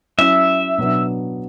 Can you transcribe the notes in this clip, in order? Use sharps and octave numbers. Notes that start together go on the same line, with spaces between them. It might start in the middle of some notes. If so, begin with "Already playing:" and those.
F#3 C#4 E4 E5
B2 F#3 B3 D4